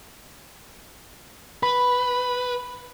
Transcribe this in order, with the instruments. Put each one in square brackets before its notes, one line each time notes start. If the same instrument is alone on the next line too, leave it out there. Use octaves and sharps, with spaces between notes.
[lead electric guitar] B4 [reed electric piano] B5